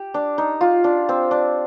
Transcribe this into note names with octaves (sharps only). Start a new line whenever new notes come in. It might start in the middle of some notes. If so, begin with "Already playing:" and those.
Already playing: G4
D4
D#4
F4
D4
C4
D4